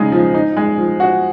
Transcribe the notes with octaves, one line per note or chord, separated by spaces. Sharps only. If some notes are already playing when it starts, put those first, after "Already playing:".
Already playing: C#3 G#3 D#4
F3
D#4
G#3
F3
F#4